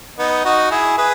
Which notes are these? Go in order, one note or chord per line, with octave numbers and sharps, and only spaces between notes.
B3 D#4
D#4 F#4
E4 G#4
G#4 B4